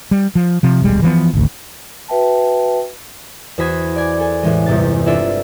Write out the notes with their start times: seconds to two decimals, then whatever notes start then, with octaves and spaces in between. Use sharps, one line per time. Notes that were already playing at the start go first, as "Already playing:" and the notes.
0.11 G3
0.35 F3
0.63 C3 F3
0.82 D#1 B1 G3 G#3
1.02 E3 F3 B3
1.33 G#1 D2
2.08 F#4 B4 E5 G5 A5
3.58 E2 F#4 C5 B5 D#6 G#6
3.96 D5 G#5 D6
4.20 A4 G#5
4.43 A1 E3 G#3
4.66 G1 E2 C3 A6
5.06 C4 D4 E4 F4 A4 E5